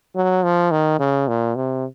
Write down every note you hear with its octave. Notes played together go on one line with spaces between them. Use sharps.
F#3
F3
D#3
C#3
A#2
C3